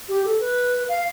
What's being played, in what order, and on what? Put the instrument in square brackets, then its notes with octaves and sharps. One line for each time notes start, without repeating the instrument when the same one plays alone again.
[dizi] G4
A4
B4
F5